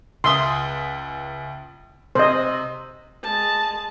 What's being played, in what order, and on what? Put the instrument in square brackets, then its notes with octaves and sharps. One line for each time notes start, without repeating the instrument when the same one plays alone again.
[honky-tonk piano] C#2 E5 D#6 [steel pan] C6
[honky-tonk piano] C3 [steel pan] C5 D#5
[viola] G#3 A5